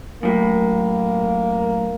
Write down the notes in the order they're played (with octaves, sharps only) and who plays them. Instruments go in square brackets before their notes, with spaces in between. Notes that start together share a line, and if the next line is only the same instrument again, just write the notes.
[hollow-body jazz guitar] F#2 A2 [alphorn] A#3